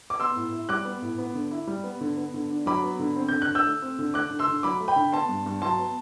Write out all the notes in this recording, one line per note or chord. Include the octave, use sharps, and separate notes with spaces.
D6
B3 C6 E6
A2
E4
G3 D6 F#6
B3
A2
B3
D3
E4
G3
B3
D3
B3
D3
D4
F#3 B5 D6
B3
D3
C4
D3 G6
F#6
D3
E6 G6
A3
C4
D3
A3 D6 F#6
D3
C6 E6
D3
F#3 B5 D6
A3
G5 B5
D3
B3 A5 C6
G2
G2
F#3 A5 C6
B3